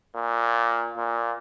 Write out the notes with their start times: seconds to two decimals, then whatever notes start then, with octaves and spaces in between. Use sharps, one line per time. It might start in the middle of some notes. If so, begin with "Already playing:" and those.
0.15 A#2
0.97 A#2